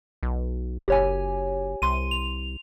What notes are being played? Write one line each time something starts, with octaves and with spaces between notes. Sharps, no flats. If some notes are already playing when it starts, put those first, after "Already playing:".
B1
F#1 G4 C#5 G#5
C2 C6 D#7
F7